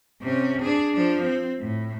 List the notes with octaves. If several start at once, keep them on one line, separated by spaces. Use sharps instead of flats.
C3 C#4
D4 G#4
F3 D4
C4
A2